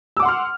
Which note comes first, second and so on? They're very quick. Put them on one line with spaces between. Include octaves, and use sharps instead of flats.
E6 D6 F#5 C6 F6